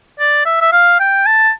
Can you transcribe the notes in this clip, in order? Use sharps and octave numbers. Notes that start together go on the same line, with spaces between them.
D5
E5
E5
F5
G5
A5